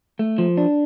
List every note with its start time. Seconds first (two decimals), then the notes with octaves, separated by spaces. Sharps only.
0.19 A3
0.38 F3
0.58 D4